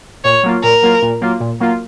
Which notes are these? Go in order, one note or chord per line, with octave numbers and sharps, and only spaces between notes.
A#2 C#5
F#3 A#3 F4
A#2 A#4
F#3 A#3 F4
A#2
F#3 A#3 F4
A#2
F#3 A#3 F4